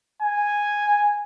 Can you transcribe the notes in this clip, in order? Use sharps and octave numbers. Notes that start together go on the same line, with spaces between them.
G#5